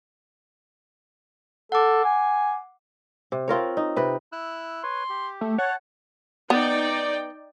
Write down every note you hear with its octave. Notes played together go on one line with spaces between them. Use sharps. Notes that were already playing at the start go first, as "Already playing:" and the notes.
A4 F#5 D6
G#5
C3
C4 F4 A#4 C#5
D#4
C3 B4 G5
E4 E6 F#6
B4 C#5 C6
G4
A3
C#5 F#5 A5
B3 D#4 D5 G5